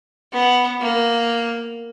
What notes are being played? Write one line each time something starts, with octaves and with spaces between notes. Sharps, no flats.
B3
A#3